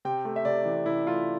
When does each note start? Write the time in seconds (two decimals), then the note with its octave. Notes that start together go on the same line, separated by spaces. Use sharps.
0.05 C3 G5
0.25 A3
0.36 E5
0.45 C3 D5
0.65 E3
0.86 C3 E4
1.07 A3 F4